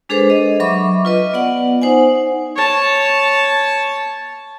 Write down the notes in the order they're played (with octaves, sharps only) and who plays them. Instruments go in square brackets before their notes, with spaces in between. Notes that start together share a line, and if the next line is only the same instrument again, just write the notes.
[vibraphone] G#3 D4 G#4 A4 B4 C5
D#5
F#3 E5 B5 C#6 D6
F4 B4 D#5
B3 D5 F#5
D#4 C5 F#5 G#5
[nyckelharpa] C#5 A5